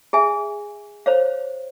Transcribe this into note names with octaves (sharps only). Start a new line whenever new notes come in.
G#4 E5 G#5
C5 C#5 F5